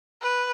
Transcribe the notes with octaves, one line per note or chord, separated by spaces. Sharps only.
B4